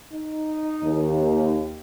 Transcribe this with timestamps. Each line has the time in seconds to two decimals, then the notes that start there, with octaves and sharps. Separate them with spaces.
0.12 D#4
0.83 D#2